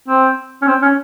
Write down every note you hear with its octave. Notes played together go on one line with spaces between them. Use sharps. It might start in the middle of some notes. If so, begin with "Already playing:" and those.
C4
C#4
C4
C#4